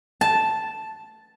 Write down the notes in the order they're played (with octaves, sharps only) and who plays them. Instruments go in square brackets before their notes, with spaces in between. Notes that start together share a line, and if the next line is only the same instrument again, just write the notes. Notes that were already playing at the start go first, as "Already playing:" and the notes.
[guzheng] A5